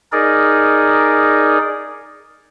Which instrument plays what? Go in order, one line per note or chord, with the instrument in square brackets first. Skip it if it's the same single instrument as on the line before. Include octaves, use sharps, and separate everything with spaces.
[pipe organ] D#4 G#4 A#4 D5